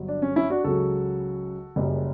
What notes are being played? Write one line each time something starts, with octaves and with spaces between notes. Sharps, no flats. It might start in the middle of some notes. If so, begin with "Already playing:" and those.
Already playing: G1 G2 F#3
D4
C#4
C#4 E4
D4 F#4
C#2 C#3 F#3 F#4 A4
F#1 F#2 C#3 G3